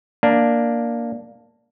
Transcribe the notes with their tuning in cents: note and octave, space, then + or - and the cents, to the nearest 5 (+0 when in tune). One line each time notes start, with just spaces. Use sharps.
A#3 +0 D4 +0